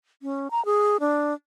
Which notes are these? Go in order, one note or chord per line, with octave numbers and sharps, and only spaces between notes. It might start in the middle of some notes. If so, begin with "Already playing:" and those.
C#4
A#5
G#4
D4